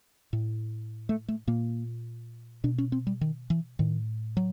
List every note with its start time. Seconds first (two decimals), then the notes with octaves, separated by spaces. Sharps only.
0.33 A2
1.09 A3
1.28 A3
1.47 A#2 A#3
2.64 B2 D4
2.78 C#4
2.92 C4
3.07 G3
3.21 D#3
3.50 E3
3.79 A2 D#3
4.37 F#3